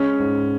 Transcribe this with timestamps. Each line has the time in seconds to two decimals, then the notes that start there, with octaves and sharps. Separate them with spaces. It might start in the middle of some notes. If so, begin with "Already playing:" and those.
Already playing: G#3 C#4
0.19 G#2